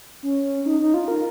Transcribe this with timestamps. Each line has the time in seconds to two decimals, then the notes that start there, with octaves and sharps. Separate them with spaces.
0.23 C#4
0.66 D#4
0.80 D#4
0.94 F4
1.08 A#4